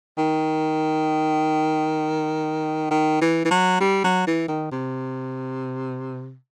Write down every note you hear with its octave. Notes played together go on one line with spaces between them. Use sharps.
D#3
D#3
E3
E3
F#3
G3
F#3
E3
D#3
C3